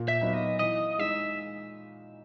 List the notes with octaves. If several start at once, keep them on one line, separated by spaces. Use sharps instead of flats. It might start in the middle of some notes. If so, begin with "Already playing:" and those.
Already playing: A#2
E5
F#3 B3 D#4
D#5
E3 D#5
G#3 D#4 E5